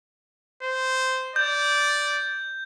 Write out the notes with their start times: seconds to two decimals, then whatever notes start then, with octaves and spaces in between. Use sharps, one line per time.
0.63 C5
1.36 D5 G6